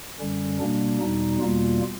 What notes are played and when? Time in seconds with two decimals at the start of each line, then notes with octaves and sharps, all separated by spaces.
0.20 F#2 D3 G3 C#4
0.60 B2 G3 A#3 D4
1.00 E2 B2 G3 D#4
1.40 E2 B2 G3 A#3 F4